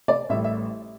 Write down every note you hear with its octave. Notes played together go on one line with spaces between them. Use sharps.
D5
A1 A2 G3 E5
E5